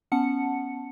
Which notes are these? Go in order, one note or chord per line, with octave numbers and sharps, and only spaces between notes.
B3 C#4 F#5 A5 C#7